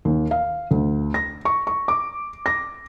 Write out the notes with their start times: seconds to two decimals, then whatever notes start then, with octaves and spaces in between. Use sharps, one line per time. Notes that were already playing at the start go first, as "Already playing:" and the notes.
0.05 D#2
0.31 F5
0.71 D2
1.14 A#6
1.45 C#6
1.67 C#6
1.88 D6
2.46 A#6